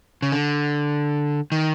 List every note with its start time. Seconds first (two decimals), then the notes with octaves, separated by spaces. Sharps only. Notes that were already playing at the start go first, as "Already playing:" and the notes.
0.22 C#3
0.32 D3
1.52 D#3